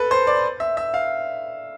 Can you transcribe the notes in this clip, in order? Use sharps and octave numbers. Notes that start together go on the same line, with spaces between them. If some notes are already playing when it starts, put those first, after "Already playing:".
Already playing: A4 B4
C5
D5
E5
E5
F5